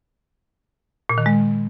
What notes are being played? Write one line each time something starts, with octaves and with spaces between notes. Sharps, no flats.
A#2
D#3
G#3